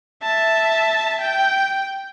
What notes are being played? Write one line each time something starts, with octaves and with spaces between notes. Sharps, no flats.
E5 A5
G5